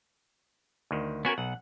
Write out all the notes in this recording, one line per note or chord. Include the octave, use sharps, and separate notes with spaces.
D2 D#3
B3 C#4 F#4 A#4 G#5
B1 F#5